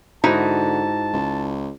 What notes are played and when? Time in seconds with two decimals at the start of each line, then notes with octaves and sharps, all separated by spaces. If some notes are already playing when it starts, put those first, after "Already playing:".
0.24 G#2 D3 D#4 E4 F#4 A5
1.14 C#2